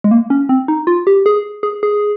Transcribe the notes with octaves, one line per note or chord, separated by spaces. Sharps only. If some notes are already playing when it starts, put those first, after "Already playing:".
G#3
A#3
C#4
C4
D#4
F4
G4
G#4
G#4
G#4